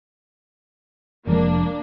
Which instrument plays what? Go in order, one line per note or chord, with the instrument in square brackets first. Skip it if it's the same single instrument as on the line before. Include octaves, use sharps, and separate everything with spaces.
[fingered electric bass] F1 F3 G#3 [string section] A#3 D4